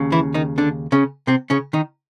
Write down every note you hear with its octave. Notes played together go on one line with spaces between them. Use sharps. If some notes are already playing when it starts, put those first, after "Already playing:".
Already playing: D#2 C#3
E3 E4
D#3 D#4
D3 D4
C#3 C#4
C3 C4
C#3 C#4
D#3 D#4